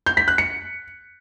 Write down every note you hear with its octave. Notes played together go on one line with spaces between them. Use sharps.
G6
B6
F#6
C#7